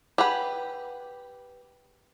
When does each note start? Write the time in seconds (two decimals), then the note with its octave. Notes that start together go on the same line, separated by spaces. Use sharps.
0.18 G4 G#4 B4 F#5 B5